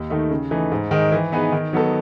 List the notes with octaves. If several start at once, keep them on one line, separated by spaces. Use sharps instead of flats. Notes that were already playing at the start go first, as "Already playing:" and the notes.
Already playing: D#2
D#3 A3 D#4
C#3
E3 A3 D#4
G#2
D#3 G#3 D#4
E3
B3 D#4 G#4 B4
D#3
F#3 B3 D#4 A4